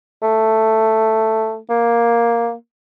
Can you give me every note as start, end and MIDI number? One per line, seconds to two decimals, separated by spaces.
0.23 1.58 57
1.70 2.53 58